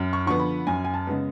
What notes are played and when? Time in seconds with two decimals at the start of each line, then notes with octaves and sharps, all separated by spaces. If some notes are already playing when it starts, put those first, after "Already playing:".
Already playing: F#2
0.13 C#6
0.27 D3 F3 B3 C#6
0.40 B5
0.67 F#2 G#5
0.85 G#5
0.94 A5
1.07 C#3 G#3 B3